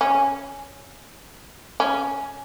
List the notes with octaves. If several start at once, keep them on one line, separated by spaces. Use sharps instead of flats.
C#4
C#4